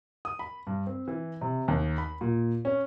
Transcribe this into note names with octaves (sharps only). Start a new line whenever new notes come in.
D#6
B5
G2
C4
E3
C3
D#2
B5
A#2
C#4